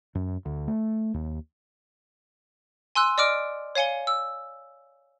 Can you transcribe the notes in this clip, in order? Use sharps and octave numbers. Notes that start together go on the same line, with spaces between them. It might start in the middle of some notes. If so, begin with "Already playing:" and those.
F#2
D2
A3
D#2
G#5 C6 E6 F#6
D5 D#5 D6 F6 D7
C#5 F5 G#5 C#7 G7
E6